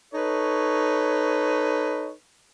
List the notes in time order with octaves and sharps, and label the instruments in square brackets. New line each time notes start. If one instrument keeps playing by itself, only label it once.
[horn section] D#4 A4 B4 C#5